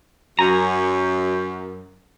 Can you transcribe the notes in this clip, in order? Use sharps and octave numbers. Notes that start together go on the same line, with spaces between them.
F#2 F#5 G#5 A#5